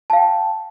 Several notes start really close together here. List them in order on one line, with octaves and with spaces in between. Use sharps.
A5 F5 G5